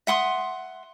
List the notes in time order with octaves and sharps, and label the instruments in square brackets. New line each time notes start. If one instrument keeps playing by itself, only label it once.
[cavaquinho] E5 F#5 C6 D#6